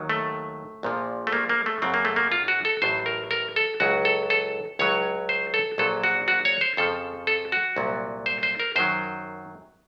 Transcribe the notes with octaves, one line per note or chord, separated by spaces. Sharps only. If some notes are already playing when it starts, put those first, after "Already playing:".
Already playing: D#2 D#3 F#3
A3
A#1 A#2 F3
A3
A#3
A#3
A3
F#2 C#3 F#3 C4
A#3
A3
A#3
F4
F#4
A4
A1 A2 F#3 C5
A#4
A#4
A4
C#2 C#3 F#3 F#4
A4
A4
C#2 C#3 F#3 C#5
C5
A4
A#1 A#2 F#3 A4
F#4
F#4
C#5
C5
F2 C#3 F3 A4
A4
F#4
C2 A#2 F#3
C5
C5
A#4
F#2 D#3 F#3 C5